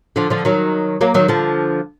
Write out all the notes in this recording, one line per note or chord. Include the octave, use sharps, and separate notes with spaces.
D3 F3
D3 F3
D#3 F#3
F#3 A#3
D#3 F#3
D3 F3